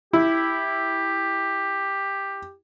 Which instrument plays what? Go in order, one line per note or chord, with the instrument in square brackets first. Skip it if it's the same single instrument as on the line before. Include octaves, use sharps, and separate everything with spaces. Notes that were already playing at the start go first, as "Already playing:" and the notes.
[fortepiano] E4 [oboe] G4